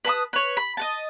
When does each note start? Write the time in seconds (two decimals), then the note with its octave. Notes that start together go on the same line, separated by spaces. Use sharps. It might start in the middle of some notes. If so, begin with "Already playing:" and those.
0.05 B4 A5 B5 D#6
0.33 B4 C#5
0.57 B5
0.77 D#5 F#5 A5